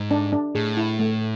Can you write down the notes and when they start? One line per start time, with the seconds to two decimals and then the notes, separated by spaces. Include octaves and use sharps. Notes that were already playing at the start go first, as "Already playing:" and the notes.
Already playing: G#2
0.11 D4
0.33 D4
0.55 A2 G#4
0.77 E4
0.99 A3